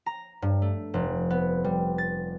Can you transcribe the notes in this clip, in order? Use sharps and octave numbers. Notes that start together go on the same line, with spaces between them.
A#5
G2
A3
F1
B3
G3
A6